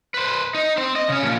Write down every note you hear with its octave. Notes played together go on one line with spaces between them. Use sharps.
B4 C5
D#4
C4 C5
D#5
C#3 C#4
A#2 F3